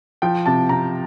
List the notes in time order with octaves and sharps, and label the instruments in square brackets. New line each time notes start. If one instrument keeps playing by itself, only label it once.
[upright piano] F3 G5
C3 A5
C3 A#5